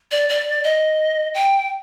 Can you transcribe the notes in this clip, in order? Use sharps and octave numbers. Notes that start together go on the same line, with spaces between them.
D5
D5
D#5
G5